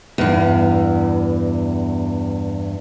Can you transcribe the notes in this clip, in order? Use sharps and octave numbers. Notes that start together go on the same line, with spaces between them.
E2 G2